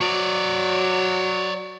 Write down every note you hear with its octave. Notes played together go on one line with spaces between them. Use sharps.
F#3 C#5 D5